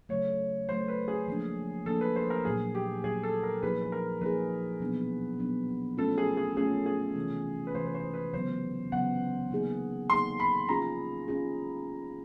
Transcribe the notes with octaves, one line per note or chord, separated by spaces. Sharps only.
C#3 F#3 A3 C#5
C#3 F#3 A3 C5
B4
G#4
F3 A#3 D4
F3 A#3 D4 A4
B4
C5
A#4
A#2 F#3 A#3 G#4
G4
A#2 F#3 A#3 G#4
A4
A#4
F3 A#3 D#4 G#4 B4
B4
A#4
F3 A#3 D#4 G#4 B4
B2 F#3 B3 D4
B2 F#3 B3 D4
A3 C#4 F4 A4
G#4
G#4
A3 C#4 F4 G#4
G#4
C3 E3 G#3
B4
C3 E3 G#3 C5
B4
C5
B4
C#3 F#3 B3 C5
C#3 F#3 B3 F#5
F#3 A#3 D#4 G#4
F#3 A#3 D#4 G#4 C6
B5
G#3 C#4 F4 G#4 A#5
G#3 C#4 F4 G#4